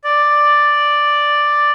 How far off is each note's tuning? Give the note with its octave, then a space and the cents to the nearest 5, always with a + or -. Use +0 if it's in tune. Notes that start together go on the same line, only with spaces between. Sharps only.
D5 +5